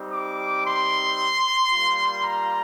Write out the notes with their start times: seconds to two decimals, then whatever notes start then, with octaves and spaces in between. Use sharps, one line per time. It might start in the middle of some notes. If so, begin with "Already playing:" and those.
Already playing: G3 C4 D#4 G4
0.11 D6
0.64 C6
1.70 G3 A#3 F4
2.24 A#5